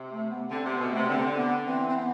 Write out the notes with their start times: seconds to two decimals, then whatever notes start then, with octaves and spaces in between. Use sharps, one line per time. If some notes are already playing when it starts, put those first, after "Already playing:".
Already playing: C3
0.12 A3
0.31 B3
0.50 D3 C4
0.65 C3
0.70 B3
0.80 B2
0.90 C3 A3
1.03 B3
1.08 D3 C4
1.37 B3
1.66 E3 C4
1.89 C4
1.96 B3